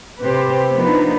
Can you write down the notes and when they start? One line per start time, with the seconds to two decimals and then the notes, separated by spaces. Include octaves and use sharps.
0.22 C3 G4 B4 C5
0.74 F3 A#3 B3 D4 D#4 B4